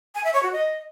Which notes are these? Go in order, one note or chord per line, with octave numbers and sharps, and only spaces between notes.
G#5
E5
C#5
F#4
D#5